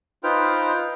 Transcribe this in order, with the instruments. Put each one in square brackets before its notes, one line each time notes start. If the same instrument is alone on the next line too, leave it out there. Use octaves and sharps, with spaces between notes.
[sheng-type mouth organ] D#4 F4 B4 C5 G5 F6